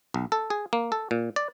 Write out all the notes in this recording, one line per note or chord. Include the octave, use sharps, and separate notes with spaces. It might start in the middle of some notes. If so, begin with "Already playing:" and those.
B1
A4
G#4
A#3
A4
A#2
D5